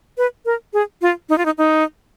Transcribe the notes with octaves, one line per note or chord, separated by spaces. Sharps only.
B4
A#4
G#4
F4
D#4
F4
D#4
D#4